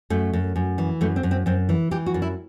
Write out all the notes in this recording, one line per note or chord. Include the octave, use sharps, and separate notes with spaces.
F#2 A3
F#2
F#2
E3
F#2 A3
C4
F#2
C4
F#2 C4
E3
E3 G4
F#4
F#2
E4